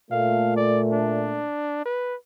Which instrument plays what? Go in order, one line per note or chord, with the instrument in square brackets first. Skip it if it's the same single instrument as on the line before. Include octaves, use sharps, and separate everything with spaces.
[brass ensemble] A#2 A3 [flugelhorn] F5
[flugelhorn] D5
D4
B4